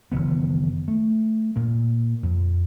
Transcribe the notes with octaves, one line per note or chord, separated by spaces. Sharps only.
F#1 D#3 E3 B3
A3
A#2 A#3
F2